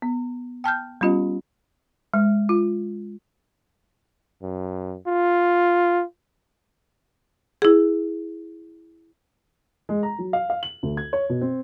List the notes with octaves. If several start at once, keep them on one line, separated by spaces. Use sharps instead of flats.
B3
G5 A5 F6 G6
G3 B3 C#4 F4 G4 D#5
G#3
F4
F#2
F4
E4 G#4
G#3
A#5
F#3
F5
F5
F#7
D2
G#6
C#5
B2
C4